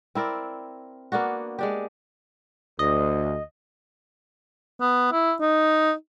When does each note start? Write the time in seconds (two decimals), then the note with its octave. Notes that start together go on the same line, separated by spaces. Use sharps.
0.15 C4 E4 A#4 D5
1.12 A#3 B3 D4 F#4
1.59 G#3 D4 G4
2.79 D2 D#5
4.81 B3
5.12 E4
5.40 D#4